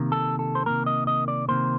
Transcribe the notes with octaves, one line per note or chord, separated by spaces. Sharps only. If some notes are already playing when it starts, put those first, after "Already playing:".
Already playing: C3 D#3 A#3
A4
A4
C5
C3 D#3 A#3 A#4
D#5
D#5
D5
C3 D#3 A#3 C5